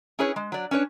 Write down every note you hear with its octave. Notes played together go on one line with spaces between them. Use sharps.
C#4 E4 G#4 B4 C#5
G#3
F#3 D5
C#4 D4 B4 C#5